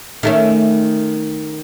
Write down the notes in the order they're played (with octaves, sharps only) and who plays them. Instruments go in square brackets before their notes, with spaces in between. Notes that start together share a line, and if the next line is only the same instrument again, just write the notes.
[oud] D#3 A3 C#4